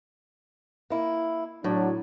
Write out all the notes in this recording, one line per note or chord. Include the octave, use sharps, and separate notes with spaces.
A#3 E4
A2 F#3 D4